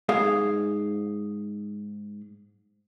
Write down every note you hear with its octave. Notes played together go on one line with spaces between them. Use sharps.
G#2 G#4 F5